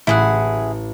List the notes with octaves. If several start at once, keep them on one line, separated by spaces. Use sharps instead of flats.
A1 E4 G#4 F#5